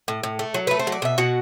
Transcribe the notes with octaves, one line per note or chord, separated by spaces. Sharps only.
A2
A2
A3
F#3
A3 B4
C5
F#3
D5
B2 E5
B2 F#4 F#5